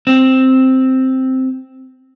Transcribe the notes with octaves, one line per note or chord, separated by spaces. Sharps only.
C4